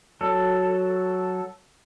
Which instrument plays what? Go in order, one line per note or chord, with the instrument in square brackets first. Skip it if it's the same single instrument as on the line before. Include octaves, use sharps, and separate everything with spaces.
[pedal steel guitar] F#3 A4